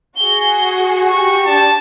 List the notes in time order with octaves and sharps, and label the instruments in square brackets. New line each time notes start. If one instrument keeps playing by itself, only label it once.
[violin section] F#4 G#4 [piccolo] G7
[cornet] G4 [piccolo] C#6
[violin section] D4 [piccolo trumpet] A5